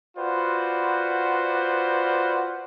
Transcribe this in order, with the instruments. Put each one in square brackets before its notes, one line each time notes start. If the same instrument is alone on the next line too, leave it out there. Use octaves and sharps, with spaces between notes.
[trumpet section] F4 F#4 B4 C5 D5 F#5